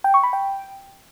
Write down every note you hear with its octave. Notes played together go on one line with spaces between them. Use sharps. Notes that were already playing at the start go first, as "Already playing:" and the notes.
G5
C#6
B5
G5